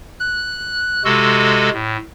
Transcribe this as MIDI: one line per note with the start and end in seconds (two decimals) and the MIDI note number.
0.19 1.03 90
1.05 1.70 48
1.05 1.70 56
1.05 1.70 66
1.05 1.70 69
1.73 1.97 45